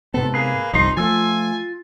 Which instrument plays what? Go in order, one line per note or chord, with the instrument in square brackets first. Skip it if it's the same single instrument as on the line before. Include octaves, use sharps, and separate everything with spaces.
[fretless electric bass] G#2 C3 B3 [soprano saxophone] A4
[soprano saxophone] A#3 [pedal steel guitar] G#4 B4
[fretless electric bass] G1 C2 [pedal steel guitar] F3 C6 [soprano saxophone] D#4
[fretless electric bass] F3 A3 [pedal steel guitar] F4 E6 [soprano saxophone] G#5